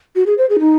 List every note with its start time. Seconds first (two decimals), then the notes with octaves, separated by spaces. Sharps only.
0.15 F#4
0.26 G#4
0.38 C5
0.49 G#4
0.59 D#4